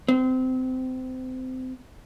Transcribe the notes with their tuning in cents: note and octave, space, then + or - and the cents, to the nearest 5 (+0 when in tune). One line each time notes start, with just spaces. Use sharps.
C4 -25